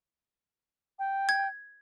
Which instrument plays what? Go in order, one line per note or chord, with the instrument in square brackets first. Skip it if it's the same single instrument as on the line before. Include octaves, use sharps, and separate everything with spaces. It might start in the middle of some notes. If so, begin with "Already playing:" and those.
[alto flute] G5
[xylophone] G#6